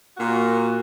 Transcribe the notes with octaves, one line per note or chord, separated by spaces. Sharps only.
A#2 A#3 F#4